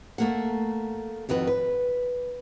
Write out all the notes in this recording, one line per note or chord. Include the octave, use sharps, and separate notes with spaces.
A3 A#3 F#5
F2 D#3 F#4 B4
B4